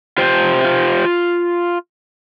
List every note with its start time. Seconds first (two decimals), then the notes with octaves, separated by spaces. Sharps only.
0.18 F4 G4 C5
0.64 F4